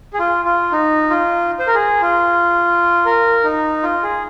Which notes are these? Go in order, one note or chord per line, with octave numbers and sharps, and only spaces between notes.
G#4
F4
F4
D#4
F4
C5
A#4
G#4
F4
A#4
D#4
F4
G#4